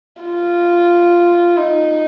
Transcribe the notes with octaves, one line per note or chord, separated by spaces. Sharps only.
F4
D#4